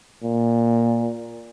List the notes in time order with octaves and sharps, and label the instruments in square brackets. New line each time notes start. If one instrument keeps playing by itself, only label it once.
[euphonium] A#2